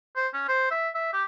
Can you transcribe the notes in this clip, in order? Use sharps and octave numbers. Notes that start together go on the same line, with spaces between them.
C5
C#4
C5
E5
E5
G4